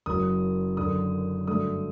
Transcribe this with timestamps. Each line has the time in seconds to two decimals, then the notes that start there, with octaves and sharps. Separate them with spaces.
0.06 F#1 F#2 F#3 D#6
0.77 F#1 F#2 D3 D#6
1.47 G2 D3 F#3 A3 D#6